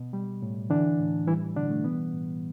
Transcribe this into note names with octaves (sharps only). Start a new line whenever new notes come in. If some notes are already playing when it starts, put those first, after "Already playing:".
Already playing: B2
G3
A2
D3 E3 D4
A2
E3 G3 E4
B2 D3 D4
A3
E3 B3
A2